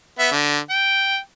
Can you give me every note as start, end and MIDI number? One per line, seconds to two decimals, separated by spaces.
0.19 0.31 59
0.19 0.31 76
0.32 0.59 50
0.70 1.17 79